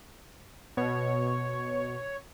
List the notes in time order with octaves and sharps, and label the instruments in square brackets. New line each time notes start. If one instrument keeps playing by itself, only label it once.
[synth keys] B2 [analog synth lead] C#5